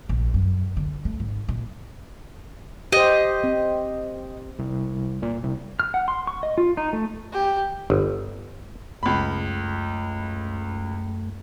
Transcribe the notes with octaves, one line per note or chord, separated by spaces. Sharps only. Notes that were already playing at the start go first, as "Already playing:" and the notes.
A#1
F#2
D3
A3
G#1
A#2
G4 C5 D#5
C4
C2
A#2
C2
F6
F#5
C6
C#6
D#5
F4
D#4
A3
G4
G1
C#2 F#2 A3 B5